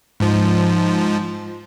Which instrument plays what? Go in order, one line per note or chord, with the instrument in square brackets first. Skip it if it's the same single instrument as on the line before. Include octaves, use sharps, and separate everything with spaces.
[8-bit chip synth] G#2 F3